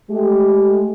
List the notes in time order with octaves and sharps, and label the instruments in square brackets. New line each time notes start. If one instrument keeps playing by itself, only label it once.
[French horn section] G#3 A3 G4